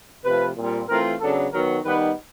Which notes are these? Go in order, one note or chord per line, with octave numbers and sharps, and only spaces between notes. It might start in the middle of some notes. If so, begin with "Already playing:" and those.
C3 F3 A3 B4
A#2 G3 C4
E3 A3 C4 F4 A#4
C#3 F#3 B3 D4 A4
D#3 F#3 B3 A#4
D#3 G3 B3 D#4 B4